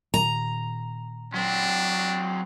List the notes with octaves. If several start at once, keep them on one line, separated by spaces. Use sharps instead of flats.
A#2 D#3 A#5
F#3 C4 D4